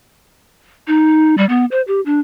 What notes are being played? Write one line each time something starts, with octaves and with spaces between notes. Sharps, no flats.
D#4
G3
B3
C5
G4
D4